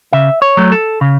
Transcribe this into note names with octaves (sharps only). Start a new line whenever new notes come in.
C#3 E5
C#5
F#3 A3
A4
C#3